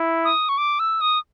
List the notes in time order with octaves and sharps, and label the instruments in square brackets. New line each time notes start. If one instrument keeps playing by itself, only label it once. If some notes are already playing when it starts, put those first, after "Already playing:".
Already playing: [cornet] E4
[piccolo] D#6
C#6
D6
E6
D#6